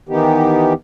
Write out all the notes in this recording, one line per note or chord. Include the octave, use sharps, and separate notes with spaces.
D#3 E3 B3 D#4 G4